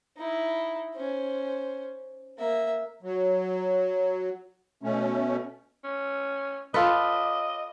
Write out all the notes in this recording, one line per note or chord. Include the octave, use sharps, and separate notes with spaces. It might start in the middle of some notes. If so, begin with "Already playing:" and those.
D#4 E4
C#4 C5
A#3 E5
F#3
B2 A3 C#4
C#4
F4 A4 B4 D#5